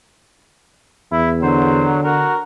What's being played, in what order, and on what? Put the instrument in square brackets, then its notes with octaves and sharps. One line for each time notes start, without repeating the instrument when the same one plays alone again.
[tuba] E2 [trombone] E4
[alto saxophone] D3 [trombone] F#3 [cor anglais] C5
[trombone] F#4 [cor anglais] A#4